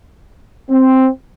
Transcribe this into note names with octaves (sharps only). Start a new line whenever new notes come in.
C4